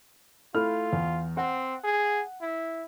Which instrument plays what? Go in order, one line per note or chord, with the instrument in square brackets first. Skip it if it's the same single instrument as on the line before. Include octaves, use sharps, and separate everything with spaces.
[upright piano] A3 E4 F6 [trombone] F4
[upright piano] E2
[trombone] C4 [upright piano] F#5
[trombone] G#4
E4